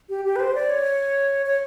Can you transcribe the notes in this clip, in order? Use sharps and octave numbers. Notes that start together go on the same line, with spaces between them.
G4
G4
B4
C5
D5
C#5
C#5